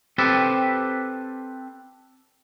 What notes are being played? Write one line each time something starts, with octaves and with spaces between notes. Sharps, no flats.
C4 G4 A4 B4 A5